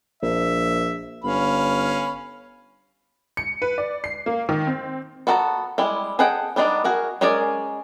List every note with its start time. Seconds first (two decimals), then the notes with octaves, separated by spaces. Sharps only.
0.23 A#1 E5
1.24 G1 C#4 F5 B5
3.37 C#7
3.62 B4
3.78 D5
4.04 C7
4.26 A#3
4.49 D#3
4.67 C4
5.27 B3 F#4 A4 F#5 A#5
5.78 G3 G#3 E4
6.19 G#4 A4 D#5 F#5 G5
6.56 G3 B3 D4 D#4
6.84 F#4 G#4 A#4
7.21 G#3 C#4 G#4 A#4 D5